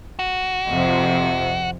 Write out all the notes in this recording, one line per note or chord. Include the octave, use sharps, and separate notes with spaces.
F#4
F2 C3